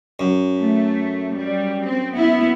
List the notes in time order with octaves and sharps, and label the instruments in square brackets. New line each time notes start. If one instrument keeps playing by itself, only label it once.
[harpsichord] F#2
[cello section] A3
G3
C4
B3 E4